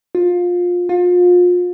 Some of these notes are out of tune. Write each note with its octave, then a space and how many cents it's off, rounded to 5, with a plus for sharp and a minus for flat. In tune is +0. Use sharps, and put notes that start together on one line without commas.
F4 +20
F4 +35